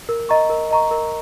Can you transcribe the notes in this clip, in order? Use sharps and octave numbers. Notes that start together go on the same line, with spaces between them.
A#4
D#5 A#5 C#6
A#4
D#5 A#5 C#6
A#4